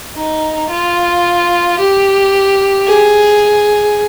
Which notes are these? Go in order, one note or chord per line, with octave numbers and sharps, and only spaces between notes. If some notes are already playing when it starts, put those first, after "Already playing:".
D#4
F4
G4
G#4